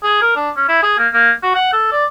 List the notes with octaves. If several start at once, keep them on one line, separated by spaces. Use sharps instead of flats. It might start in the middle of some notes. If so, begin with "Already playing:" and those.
G#4
A#4
D4
C#4
E4
G#4
A#3
A#3
F#4
F#5
A4
D5